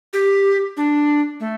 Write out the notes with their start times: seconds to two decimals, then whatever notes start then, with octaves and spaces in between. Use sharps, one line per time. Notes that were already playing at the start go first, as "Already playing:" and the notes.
0.13 G4
0.77 D4
1.40 A3